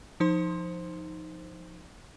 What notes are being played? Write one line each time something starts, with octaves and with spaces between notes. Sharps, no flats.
F3 D#4 C5 C6